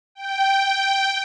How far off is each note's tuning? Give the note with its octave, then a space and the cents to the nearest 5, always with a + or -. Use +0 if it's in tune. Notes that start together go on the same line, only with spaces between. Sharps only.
G5 -5